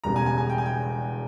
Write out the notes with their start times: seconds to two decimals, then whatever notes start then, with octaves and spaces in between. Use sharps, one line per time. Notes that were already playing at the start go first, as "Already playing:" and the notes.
0.04 E1 E2 C#3 G3 A#5
0.16 G#5
0.26 G#5
0.38 G#5
0.50 G5
0.58 G#5
0.66 G5